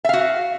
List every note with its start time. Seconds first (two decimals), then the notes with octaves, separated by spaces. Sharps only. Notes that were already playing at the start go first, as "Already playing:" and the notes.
0.04 E5
0.09 F5
0.13 F#4